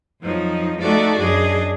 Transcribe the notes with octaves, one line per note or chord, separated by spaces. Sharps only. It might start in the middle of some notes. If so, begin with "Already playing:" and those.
F2 F3 F#3 D#4
A3 D#4 F#4 A4 D5 E5
F#2 D4 G#4 D#5